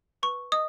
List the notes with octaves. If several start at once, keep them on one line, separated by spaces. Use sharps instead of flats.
B4 C#6
D#5 D#6